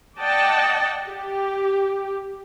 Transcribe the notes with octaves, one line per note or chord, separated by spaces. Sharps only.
D5 D#5 F#5 G5 A5
G4